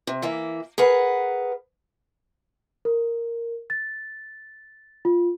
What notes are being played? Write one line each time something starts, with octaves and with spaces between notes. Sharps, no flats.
C3
E3 A#3 E5
G#4 A#4 B4 F#5
A#4
A6
F4